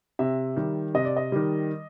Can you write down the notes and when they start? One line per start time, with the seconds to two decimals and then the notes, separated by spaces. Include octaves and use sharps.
0.19 C3 E5
0.56 D#3 G3
0.94 C3 D#5
1.05 D5
1.17 D#5
1.32 D#3 G3